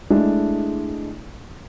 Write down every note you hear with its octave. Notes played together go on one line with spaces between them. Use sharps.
G#3 A3 D4 E4 G#4